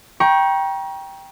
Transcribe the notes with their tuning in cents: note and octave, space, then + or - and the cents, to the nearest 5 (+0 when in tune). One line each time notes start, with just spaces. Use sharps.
G5 +0 A#5 +35 C#6 -10